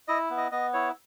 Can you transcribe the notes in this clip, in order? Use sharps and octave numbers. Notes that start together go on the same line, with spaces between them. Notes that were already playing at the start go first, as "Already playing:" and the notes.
E4 D#5
B3
D#5
B3 D#5
E4 C#5